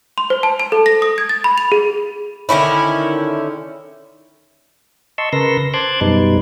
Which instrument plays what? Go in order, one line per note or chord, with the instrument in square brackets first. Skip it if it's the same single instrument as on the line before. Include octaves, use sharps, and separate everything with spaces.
[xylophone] C6
C5
A5
A5
A4
A#6
D#6
G#6
A6
B5
F7
G#4
[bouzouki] D3 D#3 C#4 E4
[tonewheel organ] D#5 A5 C6 C#6 E6
C#3 A#4 B4 C6 E6 A#6
C5 A5 C6 D6 F#6 G#6
F#2 B2 G3 D#4 B4